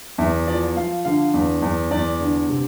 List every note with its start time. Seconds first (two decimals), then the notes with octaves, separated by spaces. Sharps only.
0.18 E2 E5
0.47 F3 D5
0.77 F3 F5
1.05 D3 F5
1.34 E2
1.62 E2
1.91 E2 D5
2.20 D3
2.49 C3